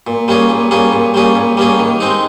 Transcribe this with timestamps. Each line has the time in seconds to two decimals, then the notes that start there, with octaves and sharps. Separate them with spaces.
0.07 A#2
0.28 G3 A#3 C#4 G#4
0.50 A#2
0.71 G3 A#3 C#4 G#4
0.93 A#2
1.14 G3 A#3 C#4 G#4
1.35 A#2
1.57 G3 A#3 C#4 G#4
1.79 D#3
2.00 G#3 C4 D#4